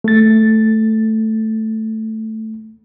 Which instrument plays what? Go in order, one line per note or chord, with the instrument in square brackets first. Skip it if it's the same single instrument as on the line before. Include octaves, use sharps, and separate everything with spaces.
[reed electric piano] A3 A6